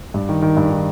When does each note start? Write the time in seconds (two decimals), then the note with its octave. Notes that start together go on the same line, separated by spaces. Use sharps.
0.14 G2
0.29 D#3
0.42 D#3
0.57 G2
0.71 D#3